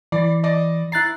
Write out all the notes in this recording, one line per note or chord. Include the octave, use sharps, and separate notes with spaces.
E3 D5
D5 D#5
E4 A#5 F#6 A6 C7